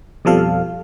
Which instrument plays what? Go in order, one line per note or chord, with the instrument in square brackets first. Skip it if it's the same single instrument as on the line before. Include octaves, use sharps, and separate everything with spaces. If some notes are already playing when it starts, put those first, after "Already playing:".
[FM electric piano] F2 B2 F3 G3 A4 F5